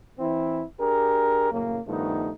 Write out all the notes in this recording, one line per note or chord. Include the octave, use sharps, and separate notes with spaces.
E3 C4 E4
D4 G4 G#4 A#4
F#2 A2 C#3 A#3
G2 D#3 F3 A3 B3 D#4